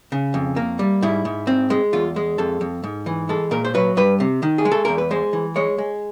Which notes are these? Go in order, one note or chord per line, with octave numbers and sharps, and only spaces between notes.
C#3
F2
A#3
G3
G#2 E4
G#2
C4
G#3
E2 F4
G#3
F2 A4
F2
G#2
E3
G#3 A4
A#2 A#4
C5
F#3 B4
G2 B4
C3
D#3
G#4
G#3
A4
E2 A#4
B4
G#3 C5
E3
G#3 C#5
G#3